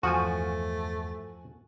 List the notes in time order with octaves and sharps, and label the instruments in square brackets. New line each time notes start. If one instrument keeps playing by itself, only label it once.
[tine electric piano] E2 G2 [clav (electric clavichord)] F3 [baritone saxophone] A3 [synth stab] F#4 G#5